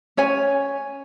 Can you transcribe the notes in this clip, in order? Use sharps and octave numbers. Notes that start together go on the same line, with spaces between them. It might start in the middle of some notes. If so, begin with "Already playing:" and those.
C#4 C#5 G#5